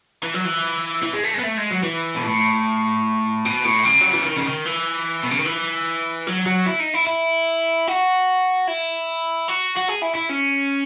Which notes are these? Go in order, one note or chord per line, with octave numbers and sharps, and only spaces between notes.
E3
F#3
E3
E3
G#3
A3
G#3
B3
A3
G#3
F#3
E3
B2
A2
B2
A2
C#3
F#3
E3
D#3
C#3
D#3
E3
B2
C#3
D#3
E3
F#3
F#3
E4
D#4
E4
E4
F#4
E4
F#4
F#4
G#4
E4
E4
C#4